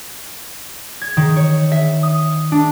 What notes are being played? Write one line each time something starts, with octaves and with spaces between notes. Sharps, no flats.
G#6
D#3
C#5
E5
D#6
D4